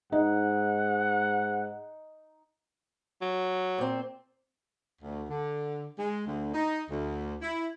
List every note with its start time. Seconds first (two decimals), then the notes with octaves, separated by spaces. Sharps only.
0.12 G#2 D#4 F#5
3.21 F#3
3.78 A#2 C4
5.02 D2
5.30 D3
5.98 G#3
6.27 D2
6.54 D#4
6.90 D2
7.42 E4